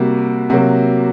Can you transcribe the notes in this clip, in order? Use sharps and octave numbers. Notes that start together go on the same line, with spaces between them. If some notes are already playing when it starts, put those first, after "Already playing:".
Already playing: C3 G3 A#3 F#4
C3 F#3 A#3 F#4